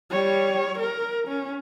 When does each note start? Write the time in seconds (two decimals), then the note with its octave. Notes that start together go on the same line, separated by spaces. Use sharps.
0.11 G3 C#5
0.79 A#4
1.28 C#4